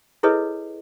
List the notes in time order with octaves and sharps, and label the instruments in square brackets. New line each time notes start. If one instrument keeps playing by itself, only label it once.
[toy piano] E4 G#4 A4 B4 C#5 D#5